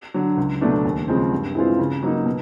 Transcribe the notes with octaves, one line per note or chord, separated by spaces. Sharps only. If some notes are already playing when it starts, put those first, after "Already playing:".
D3 F#3
C#2
B2 F#3 A3 D4
D#2
C#3 F3 G#3 C4
G2
E3 G#3 C4 F4
C#3
F#3 A#3 D#4
B2